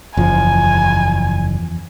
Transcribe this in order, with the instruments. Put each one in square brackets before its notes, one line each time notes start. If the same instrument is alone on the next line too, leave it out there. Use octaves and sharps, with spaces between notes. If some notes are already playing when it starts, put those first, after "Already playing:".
[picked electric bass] F#1 [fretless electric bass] E2 F3 [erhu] G#5